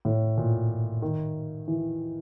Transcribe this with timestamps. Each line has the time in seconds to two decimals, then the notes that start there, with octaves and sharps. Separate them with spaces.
0.05 A2
0.37 A#2
1.02 D#3
1.68 E3